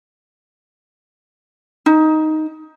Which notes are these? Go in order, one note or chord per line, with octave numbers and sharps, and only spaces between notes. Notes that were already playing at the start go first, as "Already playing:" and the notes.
D#4